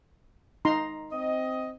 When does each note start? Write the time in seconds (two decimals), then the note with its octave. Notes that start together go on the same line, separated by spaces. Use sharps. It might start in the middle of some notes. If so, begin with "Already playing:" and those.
0.65 D#4 A#5 C6
1.12 C4 D#5